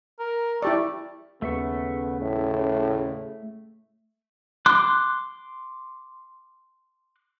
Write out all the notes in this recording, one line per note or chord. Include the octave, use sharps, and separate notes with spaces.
A#4
A3 E4 G4 D5
D#2 C#3 A3 B3 E5 C#6
A2
C6 D6 F#6